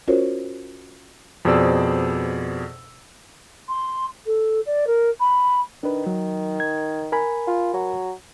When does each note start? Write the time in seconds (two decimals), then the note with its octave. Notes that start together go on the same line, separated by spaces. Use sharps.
0.08 C#4 F4 F#4 A#4 C5 C#5
1.45 F2 B2 G#4 C5 D5 E6
3.69 C6
4.26 A4
4.66 D5
4.87 A#4
5.20 B5
5.83 D#3 D4 B4
6.07 F#3
6.60 G#6
7.12 A#4 G#5 B5
7.47 F4
7.74 F#3